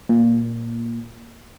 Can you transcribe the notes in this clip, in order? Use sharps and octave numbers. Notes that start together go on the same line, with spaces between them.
A#2